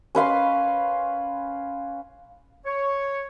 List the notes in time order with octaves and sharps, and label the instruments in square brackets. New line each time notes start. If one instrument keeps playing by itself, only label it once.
[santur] C#4 B4 F5 C6
[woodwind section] C#5